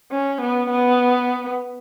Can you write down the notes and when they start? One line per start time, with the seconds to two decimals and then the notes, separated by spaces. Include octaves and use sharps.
0.12 C#4
0.42 B3
0.70 B3